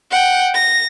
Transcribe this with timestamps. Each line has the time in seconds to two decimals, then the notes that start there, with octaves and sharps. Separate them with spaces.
0.11 F#5 G5
0.55 A#6